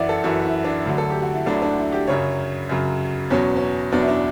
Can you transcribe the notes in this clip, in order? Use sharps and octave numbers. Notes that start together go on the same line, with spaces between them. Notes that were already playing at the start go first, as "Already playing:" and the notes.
Already playing: F#2 E3 D5 E5 F#5
A4
F#2 E3 F#4
E4
D4
D2 D3 F#3
A4
G4
F#4
E4
D2 D3 F#3 D4
D4
E4
G4
F#2 C#3 F#3 C#5
F#2 C#3 F#3
E2 B2 F#3 C#4
C#4
E2 B2 F#3 D4
E4
D4